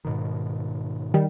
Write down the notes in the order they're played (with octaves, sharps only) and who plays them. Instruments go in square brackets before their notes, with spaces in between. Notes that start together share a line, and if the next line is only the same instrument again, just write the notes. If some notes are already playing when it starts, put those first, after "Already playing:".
[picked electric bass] G#2 B2 D#3
[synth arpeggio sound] D#3 G3